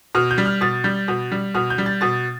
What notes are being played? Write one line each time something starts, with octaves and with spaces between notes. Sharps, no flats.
B2 F6
G6
G3
F6
B2 A6
G3 G6
B2
G3
B2 F6
G6
G3
A6
B2 A6